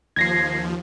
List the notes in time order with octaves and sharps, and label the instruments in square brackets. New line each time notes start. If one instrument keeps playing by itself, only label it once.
[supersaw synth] D#2 F3 [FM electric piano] G#6 A#6 C7